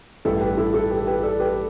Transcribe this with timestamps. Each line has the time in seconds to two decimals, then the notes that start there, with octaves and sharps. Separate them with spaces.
0.25 A1 G2 G3 B3 E4 A4
0.41 G4 B4
0.58 E4 A4
0.74 E4 A4
0.91 G4 B4
1.07 G4 B4
1.23 A4 D5
1.40 G4 B4